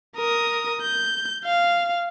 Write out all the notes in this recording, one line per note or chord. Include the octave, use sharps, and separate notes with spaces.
A#4 D#6
G6
F5